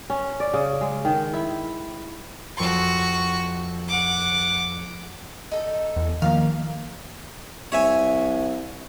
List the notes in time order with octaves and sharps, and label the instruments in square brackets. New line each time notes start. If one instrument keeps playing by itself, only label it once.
[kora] C#4
D5
C#3
G#3
D#3
E4
[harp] F2 C6 [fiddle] F#4 C#6
[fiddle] F#5 D6
[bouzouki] D#4 A4
[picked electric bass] E2
[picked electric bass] D#3 F3 A#3 [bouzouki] F5
[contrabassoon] C2 [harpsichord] C#5 E5 G#5